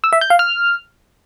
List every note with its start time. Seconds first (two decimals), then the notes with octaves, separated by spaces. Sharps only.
0.04 E6
0.13 E5
0.21 G6
0.30 F5
0.39 F6